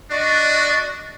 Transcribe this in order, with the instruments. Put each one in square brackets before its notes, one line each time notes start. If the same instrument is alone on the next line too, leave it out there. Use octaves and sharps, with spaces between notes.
[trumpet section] D4 F#4 [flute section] D5 D#5 C#6